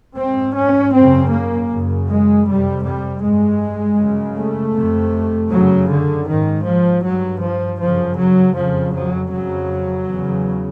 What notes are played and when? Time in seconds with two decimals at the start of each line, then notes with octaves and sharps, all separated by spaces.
0.18 G#2 C4
0.56 C#4
0.94 F#2 C#3 C4
1.32 A#3
1.70 F#2 C#3
2.08 G#3
2.46 F2 C3 G3
2.84 G3
3.22 G2 G#3
3.99 F#2 C#3
4.36 A3
4.75 F2 C3
5.51 F#2 C#3 F#3
5.89 D3
6.27 G#2 D#3
6.65 F3
7.03 G2 F#3
7.41 F3
7.79 F#2 C#3 F3
8.17 F#3
8.55 F2 C#3 F3
8.93 F#3
9.31 F2 C#3 F#3
10.08 E2 C#3